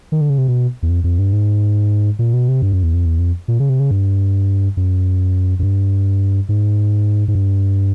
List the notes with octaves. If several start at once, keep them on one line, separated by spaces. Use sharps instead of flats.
D#3
D3
C#3
C3
B2
E2
F2
F2
G2
G#2
A#2
B2
C3
G2
F#2
E2
F2
E2
F2
A#2
C#3
C3
C#3
G2
F#2
F#2
G2
G#2
G#2
G2